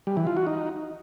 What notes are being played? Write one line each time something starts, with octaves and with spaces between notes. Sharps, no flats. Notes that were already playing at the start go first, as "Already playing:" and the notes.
G3
E3
F4
F#4
D#4